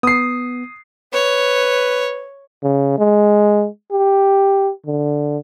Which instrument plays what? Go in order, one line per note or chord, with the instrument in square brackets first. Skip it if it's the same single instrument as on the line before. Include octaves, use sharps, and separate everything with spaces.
[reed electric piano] B3 [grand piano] D#6 C7
[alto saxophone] B4 [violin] C#5
[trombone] C#3
G#3
G4
D3